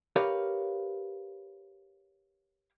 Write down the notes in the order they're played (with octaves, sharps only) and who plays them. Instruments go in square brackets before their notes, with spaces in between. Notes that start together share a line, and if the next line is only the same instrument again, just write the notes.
[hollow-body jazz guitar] G4 A#4 B4 C#5 F5